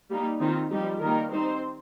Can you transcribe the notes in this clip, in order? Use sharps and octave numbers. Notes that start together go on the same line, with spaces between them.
G3 A#3 D#4
D#3 C4 D#4 F4
F3 G3 D#4 G4
D#3 G3 A#3 D#4 A#4
G3 C4 D#4 C5